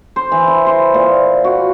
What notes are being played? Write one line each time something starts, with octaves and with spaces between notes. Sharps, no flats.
C5
E3
E4
C5
A#2
F#4